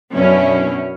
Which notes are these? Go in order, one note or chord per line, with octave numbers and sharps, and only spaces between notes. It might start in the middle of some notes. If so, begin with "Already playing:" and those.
F#2 B2 C#4 D4 E4